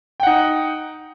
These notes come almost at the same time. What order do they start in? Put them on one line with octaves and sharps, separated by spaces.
G5 F#5 D#4